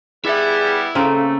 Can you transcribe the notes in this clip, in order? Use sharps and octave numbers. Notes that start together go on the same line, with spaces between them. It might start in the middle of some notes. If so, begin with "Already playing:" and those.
G3 B3 E4 G#4 E5
C#3 A3 A#3 C4 A4